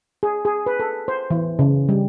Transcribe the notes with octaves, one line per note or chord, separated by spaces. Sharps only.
G#4
G#4
B4
A4
C5
E3
C#3
G3